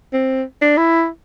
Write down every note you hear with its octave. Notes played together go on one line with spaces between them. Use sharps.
C4
D4
E4